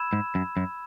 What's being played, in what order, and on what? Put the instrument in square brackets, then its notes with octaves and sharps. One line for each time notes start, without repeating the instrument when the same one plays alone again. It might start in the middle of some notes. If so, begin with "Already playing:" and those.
Already playing: [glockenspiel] B5 E6 G#6 E7
[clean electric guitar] G#2
F#2
F#2